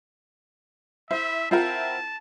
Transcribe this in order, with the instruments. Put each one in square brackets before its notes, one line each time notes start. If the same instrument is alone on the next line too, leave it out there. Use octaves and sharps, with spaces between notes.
[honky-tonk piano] E4 [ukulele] C5 [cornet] E5
[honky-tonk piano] C4 E4 A#4 [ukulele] F4 C5 F#5 [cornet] A5